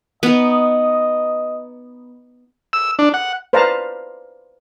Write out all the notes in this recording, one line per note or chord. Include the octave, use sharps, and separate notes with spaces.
B3 D#4 D#5
E6
D4
F#5
B4 C5 D5 F5 A5 A#5